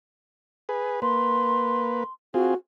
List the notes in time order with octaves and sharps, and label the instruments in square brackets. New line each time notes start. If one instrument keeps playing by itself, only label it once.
[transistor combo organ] G#4 B4
[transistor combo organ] A#3 B4 [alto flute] C6
[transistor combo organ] C4 F4 G#4 [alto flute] F#4